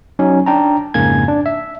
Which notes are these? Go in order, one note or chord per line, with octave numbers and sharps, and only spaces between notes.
F#3 C#4 D#4
D4 G5 A5 A#5
F2 G#2 C#3 A#3 G#5 G#6
D4
E5